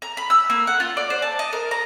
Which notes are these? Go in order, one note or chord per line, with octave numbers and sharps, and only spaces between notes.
A#5
B5
E6
A#3
F#5
F4
D5
C5
A5
D#5
A#4
A#5